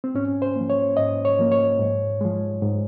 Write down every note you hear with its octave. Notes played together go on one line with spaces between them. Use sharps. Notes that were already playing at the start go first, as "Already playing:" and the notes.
C4
G#2 C#4
C5
F3 A#3
C#5
G#2 D#5
C#5
F3 A#3
C#5
G#2
F3 G#3
G#2